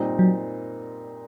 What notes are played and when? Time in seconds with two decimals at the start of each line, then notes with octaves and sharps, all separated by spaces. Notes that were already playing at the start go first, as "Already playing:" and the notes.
Already playing: A#2 G3 C4 D#4
0.19 F#3